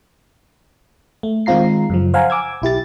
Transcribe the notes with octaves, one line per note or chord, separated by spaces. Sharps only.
A3
D#3 G#3 C4 F4 A#5 C7
F#2 C#3 F3
C5 F5 F#5 G#5 A#5
G#5 D6 E6 G#6
B1 E4 G4 A6